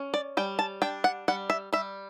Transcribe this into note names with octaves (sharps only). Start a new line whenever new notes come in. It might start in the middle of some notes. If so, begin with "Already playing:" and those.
Already playing: C#4
D5
G3 G5
A5
D4 G5
F#5
G3 F#5
E5
G3 E5